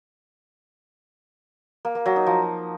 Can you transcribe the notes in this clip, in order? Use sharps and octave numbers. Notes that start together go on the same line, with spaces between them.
A#3
A#3
F#3
D#4
F3